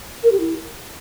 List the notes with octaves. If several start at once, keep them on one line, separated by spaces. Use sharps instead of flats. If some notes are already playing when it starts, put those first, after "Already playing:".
A#4
G4
E4